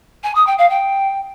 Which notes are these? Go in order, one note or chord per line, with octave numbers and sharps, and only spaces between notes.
G#5
D#6
G5
F5
G5